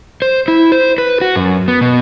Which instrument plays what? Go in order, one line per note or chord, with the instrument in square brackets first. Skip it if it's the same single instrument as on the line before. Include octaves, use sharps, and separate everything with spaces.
[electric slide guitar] C5
E4
C5
B4
F#4
F#2
B3
B2